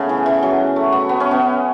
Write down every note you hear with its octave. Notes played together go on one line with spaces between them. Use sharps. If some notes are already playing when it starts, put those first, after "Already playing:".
Already playing: C#3 A3 B3
E3
E3
F#3
A3
B3
B3
C#4
B3